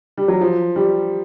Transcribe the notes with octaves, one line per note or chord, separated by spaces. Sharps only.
G3
F#3
F3
G3